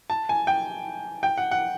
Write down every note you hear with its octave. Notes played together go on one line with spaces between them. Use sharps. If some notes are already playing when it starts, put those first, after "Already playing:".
A5
G#5
G5
G5
F#5
F#5